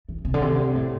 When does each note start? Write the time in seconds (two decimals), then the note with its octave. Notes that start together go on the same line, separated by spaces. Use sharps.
0.09 E3
0.25 C3
0.34 D3
0.42 C3
0.75 A2